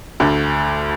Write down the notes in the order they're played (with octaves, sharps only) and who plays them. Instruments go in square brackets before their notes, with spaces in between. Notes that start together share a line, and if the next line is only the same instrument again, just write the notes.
[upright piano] D2 D3